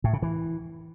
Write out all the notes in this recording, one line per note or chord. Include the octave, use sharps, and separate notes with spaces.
A2
C#3
E3